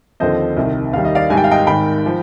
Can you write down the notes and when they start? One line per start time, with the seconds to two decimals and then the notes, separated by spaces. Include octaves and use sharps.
0.20 D#2 D3 F3 C4 C5 D#5
0.57 C2 C3 D#3
0.93 D#2 D#3 G3 F5
1.05 D#5
1.15 D5 F5
1.30 G#1 G#2 G3 G#5
1.37 G5
1.44 F5
1.51 D#5 G5
1.67 G#1 G#2 D#3 G5 B5
2.06 F3